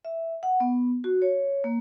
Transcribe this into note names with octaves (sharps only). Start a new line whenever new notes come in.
E5
F#5
B3
F#4
C#5
A#3